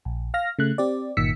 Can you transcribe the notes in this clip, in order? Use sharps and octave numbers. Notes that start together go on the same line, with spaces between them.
A#1
F5 F6 A#6
C#3 A3 F#6
C4 G4 D5
G1 A#2 D#3 E6 B6 C#7